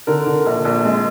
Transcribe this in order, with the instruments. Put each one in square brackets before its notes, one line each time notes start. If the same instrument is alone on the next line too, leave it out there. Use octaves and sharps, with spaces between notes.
[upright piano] D3 A#4
D3
A#1
A#1
G#3